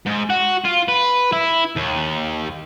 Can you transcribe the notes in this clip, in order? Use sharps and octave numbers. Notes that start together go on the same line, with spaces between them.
G#2
F#4
F4
B4
E4
D#2